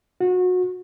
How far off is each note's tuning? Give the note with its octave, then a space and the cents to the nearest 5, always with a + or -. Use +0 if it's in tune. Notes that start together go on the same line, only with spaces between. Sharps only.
F#4 -25